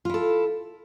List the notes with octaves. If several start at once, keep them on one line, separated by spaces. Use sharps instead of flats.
E4 F4 A4